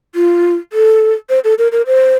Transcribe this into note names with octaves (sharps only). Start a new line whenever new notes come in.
F4
A4
C5
A4
A#4
A#4
C5